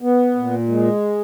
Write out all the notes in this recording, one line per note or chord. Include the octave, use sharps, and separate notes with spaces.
B3
A#2
G#3